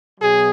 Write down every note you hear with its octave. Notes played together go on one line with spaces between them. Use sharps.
B2 F#3 G#4